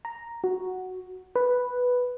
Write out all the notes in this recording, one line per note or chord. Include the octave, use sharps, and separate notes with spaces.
A#5
F#4
B4